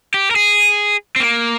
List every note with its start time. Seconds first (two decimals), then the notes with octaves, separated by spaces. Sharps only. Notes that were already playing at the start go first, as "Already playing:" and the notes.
0.14 G4
0.31 A#4
0.36 G#4
1.16 C4
1.20 A#3